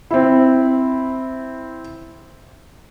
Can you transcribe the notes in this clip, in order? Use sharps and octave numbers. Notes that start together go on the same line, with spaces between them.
C4 E4